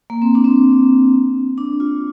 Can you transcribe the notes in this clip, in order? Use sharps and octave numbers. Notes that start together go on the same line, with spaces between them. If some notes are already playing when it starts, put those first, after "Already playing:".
A#3
C4
D4
C4
D4
F4